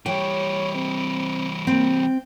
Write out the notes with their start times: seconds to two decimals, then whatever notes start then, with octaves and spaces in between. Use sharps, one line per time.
0.06 E3 G3 C#5 G5
0.75 C4
1.67 A#3 C4
2.00 G5